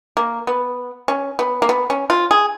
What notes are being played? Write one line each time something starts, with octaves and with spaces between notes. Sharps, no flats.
A#3
B3
C#4
B3
A#3
B3
C#4
F4
G#4